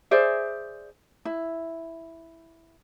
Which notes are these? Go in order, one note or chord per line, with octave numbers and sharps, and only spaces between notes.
G#4 C5 D5 E5
E4